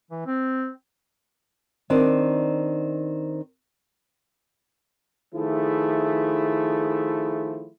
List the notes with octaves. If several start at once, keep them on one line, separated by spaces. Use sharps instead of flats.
E3
C4
D#3 C4 D4 D5
D#3 F3 A3 E4 G#4